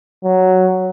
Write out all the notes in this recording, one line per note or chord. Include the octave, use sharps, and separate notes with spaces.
F#3